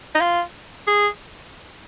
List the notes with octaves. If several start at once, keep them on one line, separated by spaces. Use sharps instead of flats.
D#4
F4
G#4